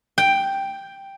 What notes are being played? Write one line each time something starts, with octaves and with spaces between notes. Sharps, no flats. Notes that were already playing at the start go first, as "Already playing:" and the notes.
G5